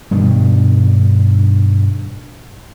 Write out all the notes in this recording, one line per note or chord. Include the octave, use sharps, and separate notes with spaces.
G2 B2 D#3